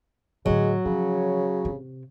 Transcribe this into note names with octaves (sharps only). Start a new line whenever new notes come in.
A2 D3 F#3 G#3
C#3 F3
C3